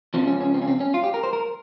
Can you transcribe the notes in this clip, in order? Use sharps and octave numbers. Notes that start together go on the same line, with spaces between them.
C#2 C#3 F3 C4
C#4
C#4
C4
C#4
C4
C#4
F4
G4
A#4
C5
A#4